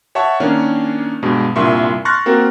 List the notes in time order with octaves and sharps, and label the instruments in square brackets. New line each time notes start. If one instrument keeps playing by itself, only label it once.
[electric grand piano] C#5 E5 F#5 A5 C#6
D#3 A#3 C#4 D4 C#5
G2 B2 G#3
C2 G2 A#2 E5 C6 C#6
C6 C#6 F6 F#6 A6 A#6
A#3 C4 F#4 A#4